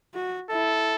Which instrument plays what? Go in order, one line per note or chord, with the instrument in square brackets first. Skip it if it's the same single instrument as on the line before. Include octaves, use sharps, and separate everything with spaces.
[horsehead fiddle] F#4
[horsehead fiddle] E4 [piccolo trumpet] A4